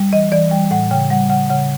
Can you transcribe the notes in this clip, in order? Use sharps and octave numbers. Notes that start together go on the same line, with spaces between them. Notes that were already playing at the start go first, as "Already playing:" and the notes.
Already playing: G3
E3 D#5
E3 D5
G3 G5
A2 F#5
C#3 G5
G3 F#5
C#3 F#5
C#3 F#5